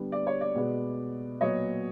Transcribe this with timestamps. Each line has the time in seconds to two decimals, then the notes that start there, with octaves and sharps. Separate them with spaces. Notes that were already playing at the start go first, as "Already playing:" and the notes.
Already playing: D3 G3 B3
0.12 D5
0.27 C#5
0.41 D5
0.55 B2 G#3 B3
1.41 A#2 F#3 B3 C#5 D#5